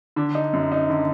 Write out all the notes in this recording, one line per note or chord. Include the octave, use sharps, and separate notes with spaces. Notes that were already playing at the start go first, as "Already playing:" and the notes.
D3 D4
D#4
F#2
D#4
D3